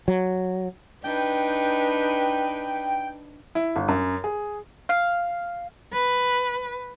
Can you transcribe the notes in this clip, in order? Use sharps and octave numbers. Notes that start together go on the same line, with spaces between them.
F#3
D4 D#4 B4 G5
E4
G1
F#2
G#4
F5
B4